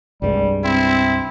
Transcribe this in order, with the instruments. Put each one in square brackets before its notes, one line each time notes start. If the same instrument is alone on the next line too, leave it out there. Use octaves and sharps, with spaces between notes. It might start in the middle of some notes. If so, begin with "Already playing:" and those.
[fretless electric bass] C2 G2 G#3 [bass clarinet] G3
[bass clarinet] C4 [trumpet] E4